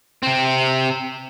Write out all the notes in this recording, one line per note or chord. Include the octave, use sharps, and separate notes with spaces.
C3 C4